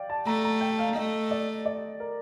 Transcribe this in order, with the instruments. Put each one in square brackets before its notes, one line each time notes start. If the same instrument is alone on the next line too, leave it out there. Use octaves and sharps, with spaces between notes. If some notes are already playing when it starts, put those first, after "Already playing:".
Already playing: [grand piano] D5 F5 G5
A5
[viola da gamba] A3 [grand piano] A#5
[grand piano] A#5
G5
F5
[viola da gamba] A3 [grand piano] D#5
[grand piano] D5
D5
A#4